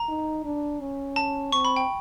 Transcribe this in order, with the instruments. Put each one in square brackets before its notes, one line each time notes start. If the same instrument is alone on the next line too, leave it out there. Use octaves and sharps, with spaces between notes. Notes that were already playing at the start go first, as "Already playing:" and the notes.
Already playing: [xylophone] A#5
[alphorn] D#4
D4
C#4
[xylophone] A5
[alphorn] C4 [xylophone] C#6
[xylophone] B5
G5